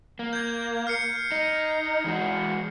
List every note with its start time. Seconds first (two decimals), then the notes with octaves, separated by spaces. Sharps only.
0.19 A#3
0.33 G6 G#6
0.87 F6 C7 C#7
1.32 D#4
2.04 E3 G#3 F#4